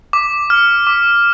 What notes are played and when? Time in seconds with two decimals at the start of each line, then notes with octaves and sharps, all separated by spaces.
0.13 D6
0.50 F6
0.87 D6